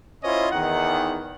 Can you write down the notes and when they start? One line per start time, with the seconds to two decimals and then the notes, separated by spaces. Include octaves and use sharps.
0.24 C#4 E4 F4 C5 C#5 D#5
0.52 E2 D#3 F#5